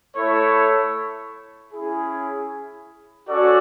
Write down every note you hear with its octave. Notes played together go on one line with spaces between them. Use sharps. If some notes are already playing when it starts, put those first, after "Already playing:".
A3 E4 A4 C#5
C#4 E4 G#4
C#4 F#4 A4 D5